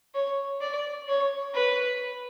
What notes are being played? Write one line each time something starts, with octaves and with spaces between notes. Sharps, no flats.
C#5
D5
C#5
B4